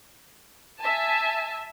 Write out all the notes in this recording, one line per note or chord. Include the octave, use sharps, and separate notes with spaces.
E5 G#5 A5